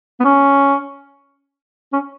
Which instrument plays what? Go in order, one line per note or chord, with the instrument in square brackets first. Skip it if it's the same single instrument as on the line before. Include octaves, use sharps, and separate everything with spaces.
[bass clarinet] B3
C#4
C#4